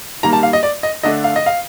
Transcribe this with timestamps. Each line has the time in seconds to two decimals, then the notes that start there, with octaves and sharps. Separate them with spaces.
0.23 D#3 G3 A#3 A#5
0.33 A5
0.43 F5
0.53 D#5
0.63 D5
0.83 D#5
1.03 D3 A3 D4 D#5
1.24 F5
1.36 D#5
1.46 F5